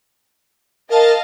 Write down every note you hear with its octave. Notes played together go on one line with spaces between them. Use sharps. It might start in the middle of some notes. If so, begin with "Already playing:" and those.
A#4 D#5 F5 A5